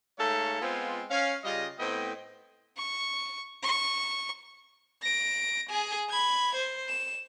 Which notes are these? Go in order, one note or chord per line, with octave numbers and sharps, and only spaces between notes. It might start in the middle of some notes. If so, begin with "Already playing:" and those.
G#2 A3 A4 C#5 F5
G#3 B3 C4 F4
C#4 F5
C#3 G3 F4 D#5
A2 B3 C4 D#5 G5
C#6
C#6
A#6 D7
G#4 G#5
B5 G#6
C5
E7